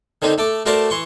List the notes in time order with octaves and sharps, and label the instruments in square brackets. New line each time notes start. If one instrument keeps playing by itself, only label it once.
[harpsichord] D3 D#3 C4 D#4
A3 A4 D6
A3 F#4 A#4 C5 D5 A5
E3 C6 C#6